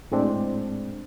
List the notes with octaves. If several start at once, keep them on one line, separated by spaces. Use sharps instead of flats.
A2 G#3 C4 D4